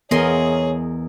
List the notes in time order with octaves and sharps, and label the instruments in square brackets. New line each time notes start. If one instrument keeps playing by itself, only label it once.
[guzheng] E2 D#5 C6 [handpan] B3 A#4 [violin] G#4 [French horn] C#5